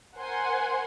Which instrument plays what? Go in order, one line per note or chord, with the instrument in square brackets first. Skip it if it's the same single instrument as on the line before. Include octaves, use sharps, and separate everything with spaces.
[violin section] A#4 C5 F#5 G#5 C6